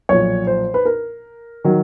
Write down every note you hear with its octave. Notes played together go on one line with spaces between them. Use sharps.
B1 A#2 F3 C#5
C5
B4
A#4
D#3 F#3